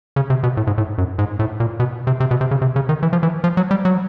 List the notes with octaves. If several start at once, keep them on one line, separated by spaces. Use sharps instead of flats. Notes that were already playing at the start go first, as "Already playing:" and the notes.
C#3
C3
B2
A2
G#2
A2
F#2
G#2
A2
A#2
B2
C3
C3
B2
C3
C#3
C3
C#3
D#3
E3
F3
E3
F3
F#3
G3
F#3